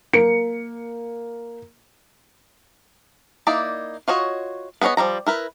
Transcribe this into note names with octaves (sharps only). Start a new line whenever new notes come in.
A#3 C#7
A#3 D#4 E4 D5
F4 F#4 C#5 D#5
B3 G#4 B4 C#5 D#5
F3 G3 G#3 A#5
E4 A#4 B4